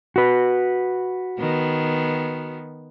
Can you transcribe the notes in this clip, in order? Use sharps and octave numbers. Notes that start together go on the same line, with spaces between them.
F#4 B4
D#3 B3